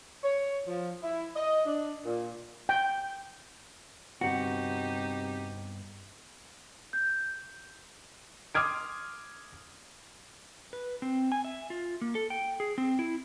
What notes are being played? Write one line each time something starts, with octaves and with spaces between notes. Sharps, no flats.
C#5
F3
E4
D#5
D4
A#2
G5
G2 C3 B3 D#4 F#4 G4
G6
C6 D6 D#6 F6 G#6 D7
B4
C4
G#5
E5
F4
A#3
A4
G5
G#4
C4
E4